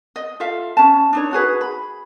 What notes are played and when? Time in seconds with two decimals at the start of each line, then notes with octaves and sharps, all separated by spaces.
0.16 D#5
0.40 F4 A4 E5 F5
0.77 C#4 A5
1.13 D4 D#4 C#5
1.31 D#4 F#4 G#4 B4
1.61 B5